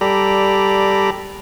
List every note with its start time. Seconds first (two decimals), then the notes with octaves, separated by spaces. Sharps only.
0.01 G3 G4 A4 D5 A#5 B5